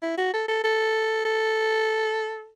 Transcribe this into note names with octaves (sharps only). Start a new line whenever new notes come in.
E4
F#4
A4
A4
A4
A4